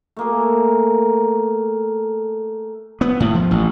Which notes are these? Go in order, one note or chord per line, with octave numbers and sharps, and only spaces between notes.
A3 A#3 G#4
B3
A2
F3
A1